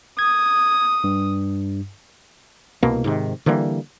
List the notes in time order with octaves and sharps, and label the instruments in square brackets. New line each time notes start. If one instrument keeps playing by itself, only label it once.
[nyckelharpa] D#6 [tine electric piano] G#6
[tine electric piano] G2
[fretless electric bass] C2 B2 A#3
G#2 C3 D#3
D3 E3 G3 A#3